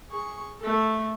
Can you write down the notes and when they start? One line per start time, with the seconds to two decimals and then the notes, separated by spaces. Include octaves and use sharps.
0.10 G#4 C#6
0.60 A3 A4